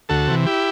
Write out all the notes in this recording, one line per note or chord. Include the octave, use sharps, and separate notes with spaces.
D2 F#4 A4
C3 E3
E4 G4